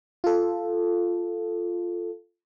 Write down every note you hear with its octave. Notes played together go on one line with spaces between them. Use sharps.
F4 A4